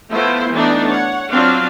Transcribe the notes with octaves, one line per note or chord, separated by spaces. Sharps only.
F3 A3 B3 E4 C5
E3 A3 B3 D4 D#4 D5
C#5 F#5
F#3 C4 D4 F4 D5 F5